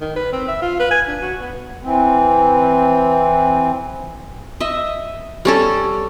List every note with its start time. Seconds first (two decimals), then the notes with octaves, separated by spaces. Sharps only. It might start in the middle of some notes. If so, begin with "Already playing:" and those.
0.01 D#3
0.16 B4
0.33 C4
0.48 E5
0.62 F4
0.79 B4
0.91 G#5
1.07 D4
1.22 F#4
1.40 B3
1.84 E3 C4
4.60 D#5 E5
5.45 G3 C#4 A4